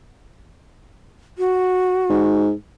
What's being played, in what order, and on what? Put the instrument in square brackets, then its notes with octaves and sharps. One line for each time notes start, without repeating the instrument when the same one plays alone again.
[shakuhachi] F#4
[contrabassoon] G#2